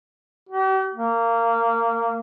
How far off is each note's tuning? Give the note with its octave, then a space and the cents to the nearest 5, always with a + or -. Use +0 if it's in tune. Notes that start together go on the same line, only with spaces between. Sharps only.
G4 -45
A#3 -20